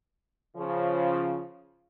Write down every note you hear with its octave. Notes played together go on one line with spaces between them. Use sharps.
C#3 F3